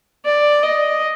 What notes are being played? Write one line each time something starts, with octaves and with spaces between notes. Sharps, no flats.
D5
D#5